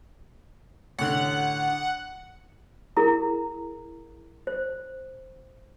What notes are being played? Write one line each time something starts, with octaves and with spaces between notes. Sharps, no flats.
A1 D3 F#5
E4 G#4 A#4 A#5
C5